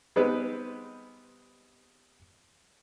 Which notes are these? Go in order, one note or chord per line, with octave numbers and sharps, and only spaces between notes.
G3 G#3 B3 C4 D#4 B4